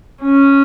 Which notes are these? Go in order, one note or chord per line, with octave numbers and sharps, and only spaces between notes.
C#4